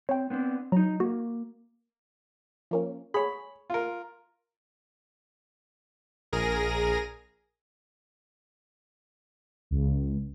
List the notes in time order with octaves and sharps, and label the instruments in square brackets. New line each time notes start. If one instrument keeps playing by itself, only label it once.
[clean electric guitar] C4 [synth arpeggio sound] C#5 G5
[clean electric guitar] B3 C4 D4
[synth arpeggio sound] F#3 [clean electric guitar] D#4 A#5
[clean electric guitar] A#3 [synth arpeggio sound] F#4
[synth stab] F3 A#3 C#4
[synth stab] G#4 C#5 [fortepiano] B5
[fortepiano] F4 A#4
[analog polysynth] A#1 G#4 A#4 A#6 D#7
C#2